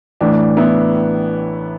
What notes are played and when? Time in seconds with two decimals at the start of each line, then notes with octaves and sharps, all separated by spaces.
0.21 A1 A2 E3 D4
0.57 B3 E4